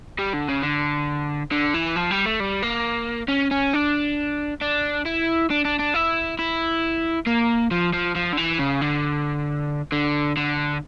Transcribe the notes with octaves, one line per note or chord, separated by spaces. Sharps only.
G3
D3
C#3
D3
D3
E3
F3
G3
A3
G3
A#3
C#4
C#4
D4
D4
E4
D4
D4
D4
E4
E4
A#3
F3
F3
F3
D3
E3
C#3
D3
D3
D3